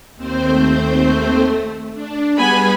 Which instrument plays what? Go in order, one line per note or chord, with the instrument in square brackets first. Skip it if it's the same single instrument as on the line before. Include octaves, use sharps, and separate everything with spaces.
[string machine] D#2 C4 C5
[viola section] A3
[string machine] D4
[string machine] G3 G#4 B4 [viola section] B3 G#5 B5